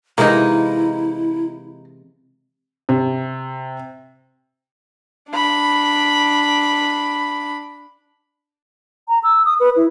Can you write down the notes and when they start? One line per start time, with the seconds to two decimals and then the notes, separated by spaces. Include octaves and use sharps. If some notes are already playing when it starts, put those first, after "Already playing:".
0.18 C3 E3 G#3 A#3 D#4 E4
2.89 C3
5.30 D4 B5
9.08 A#5
9.23 E6
9.45 D#6
9.60 B4
9.76 E4